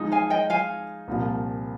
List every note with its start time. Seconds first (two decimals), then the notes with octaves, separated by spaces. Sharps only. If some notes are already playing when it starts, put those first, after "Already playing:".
Already playing: F3 G#3 D#4
0.12 F5 G#5
0.30 D#5 G5
0.50 F5 G#5
1.08 C2 A#2 F3